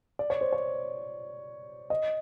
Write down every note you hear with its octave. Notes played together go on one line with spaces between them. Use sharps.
D5
C#5
C5
C#5
D#5